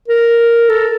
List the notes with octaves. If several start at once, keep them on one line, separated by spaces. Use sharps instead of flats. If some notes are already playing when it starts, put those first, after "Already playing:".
A#4
A4